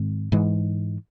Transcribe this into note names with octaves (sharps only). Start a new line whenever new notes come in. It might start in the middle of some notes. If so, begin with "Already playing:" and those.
Already playing: G#2 D#3 G#3 C4
G#2 E3 G#3